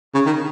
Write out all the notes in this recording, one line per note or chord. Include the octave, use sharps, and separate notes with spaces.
C#3
D#3